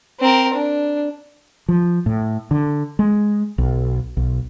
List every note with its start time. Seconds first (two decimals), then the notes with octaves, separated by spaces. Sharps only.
0.20 C4 A#4
0.53 D4
1.69 F3
2.06 A2
2.51 D3
2.99 G#3
3.58 B1
4.17 B1